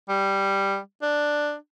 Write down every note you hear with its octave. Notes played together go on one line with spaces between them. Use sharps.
G3
D4